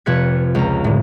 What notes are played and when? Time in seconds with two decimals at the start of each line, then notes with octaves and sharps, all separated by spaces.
0.06 F1 F2 C3 B4 G#6 C#7
0.55 C#2 A#5
0.84 A2 D3